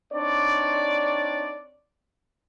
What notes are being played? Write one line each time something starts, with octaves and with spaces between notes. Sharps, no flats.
C4 D4 D#4 C#5 D5